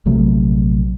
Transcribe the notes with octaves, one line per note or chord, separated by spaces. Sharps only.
A#1 C3 F#3 A3